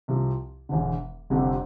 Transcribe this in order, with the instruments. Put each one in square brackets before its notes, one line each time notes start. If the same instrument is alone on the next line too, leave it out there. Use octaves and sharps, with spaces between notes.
[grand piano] C2 C3 F3
E1 E2 D3
F1 F2 D3 G3 C4